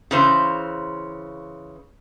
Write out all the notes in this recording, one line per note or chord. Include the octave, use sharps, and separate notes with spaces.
C#3 E3 C5